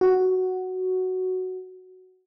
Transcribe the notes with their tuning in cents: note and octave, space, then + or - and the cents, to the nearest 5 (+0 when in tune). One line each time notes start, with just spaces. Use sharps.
F#4 +5